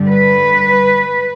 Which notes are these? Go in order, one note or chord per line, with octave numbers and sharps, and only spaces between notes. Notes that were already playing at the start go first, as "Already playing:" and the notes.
Already playing: G2 D3 G3
B4